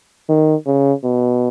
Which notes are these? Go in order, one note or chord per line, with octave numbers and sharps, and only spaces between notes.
D#3
C#3
B2